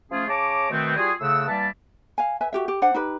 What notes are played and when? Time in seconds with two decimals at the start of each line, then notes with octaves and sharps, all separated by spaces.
0.11 F3 A3 C#4 F4 G#4
0.28 C#3 C#5 A5 A#5 D6
0.71 B2 D#3 A3 B3 C4
0.96 G3 F4 F#4 G#4
1.20 A2 C#3 A3 F#5 E6
1.47 E3 G3 A#3 D5 E5 A5
2.18 F5 G#5
2.41 B4 E5 G#5
2.53 F#4 G4 E5
2.68 G4
2.82 D4 C5 F#5
2.94 D#4 G4 B4